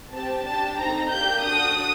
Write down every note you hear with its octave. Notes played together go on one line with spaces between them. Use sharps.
C4 G4 A5
D4 G4 A5
C4 D#4 A4 A#5
A#3 D4 G4 G6
D4 F#4 A4 D#6